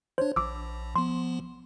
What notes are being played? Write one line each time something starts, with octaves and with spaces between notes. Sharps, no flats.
D4 C5 C#5
A#1 D6 E6
F3 B3 C6